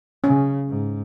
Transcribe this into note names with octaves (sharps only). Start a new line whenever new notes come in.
C#3 C#4
G#2